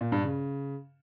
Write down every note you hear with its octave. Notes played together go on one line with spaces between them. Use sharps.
A#2
G2
C#3